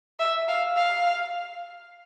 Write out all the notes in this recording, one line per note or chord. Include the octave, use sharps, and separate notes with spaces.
E5
F5
F5